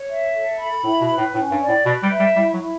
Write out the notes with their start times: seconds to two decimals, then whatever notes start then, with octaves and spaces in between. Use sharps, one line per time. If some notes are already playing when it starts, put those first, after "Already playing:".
Already playing: C#5
0.08 E5
0.33 A4
0.59 B5
0.84 A2 E4
1.01 B2
1.09 B4
1.18 A2
1.34 A2 C#4
1.51 G2
1.60 D5
1.68 A2
1.85 B2 B4
2.03 G3
2.11 E5
2.20 G3
2.36 G3 E4
2.54 F#3
2.61 E4